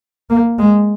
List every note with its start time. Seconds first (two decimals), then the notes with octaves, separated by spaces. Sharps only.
0.30 A#3
0.59 G#3